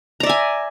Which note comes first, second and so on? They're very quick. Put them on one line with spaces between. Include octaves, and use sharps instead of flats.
A#5 D5 E5 G#5